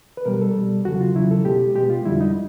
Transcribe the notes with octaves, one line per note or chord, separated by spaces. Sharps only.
B4
B2 G3 A#4
A4
B2 G3
E2 C#3 F#3 F#4
F4
E2 C#3 F#3 E4
A4
B2 G#3 G4
B2 G#3 G4
F4
F2 D3 G3 E4
D#4